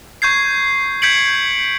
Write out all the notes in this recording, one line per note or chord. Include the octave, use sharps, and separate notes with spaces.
C#6 G6 G#6 C7
G6 G#6 B6 C#7 D7 F#7